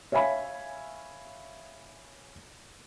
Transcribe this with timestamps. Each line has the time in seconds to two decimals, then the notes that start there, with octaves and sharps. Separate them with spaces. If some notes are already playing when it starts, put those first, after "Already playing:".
0.12 C#5 E5 F5 G#5 B5